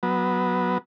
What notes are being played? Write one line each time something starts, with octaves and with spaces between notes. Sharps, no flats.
F#3 B3